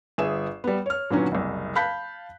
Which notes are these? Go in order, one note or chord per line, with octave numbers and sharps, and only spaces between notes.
G1 G#4 E5 G#5 E7
G3 B3
C#5 F6
A#2 D3 D#3 F#3 B3 C#4
F#1 C2
F5 A5 B5 F#6 G6 B6